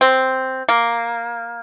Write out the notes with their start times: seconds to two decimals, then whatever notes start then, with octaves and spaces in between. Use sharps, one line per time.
0.01 C4
0.69 A#3